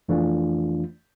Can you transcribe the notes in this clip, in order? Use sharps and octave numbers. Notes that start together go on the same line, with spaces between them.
F2 E3 A3 D4 F4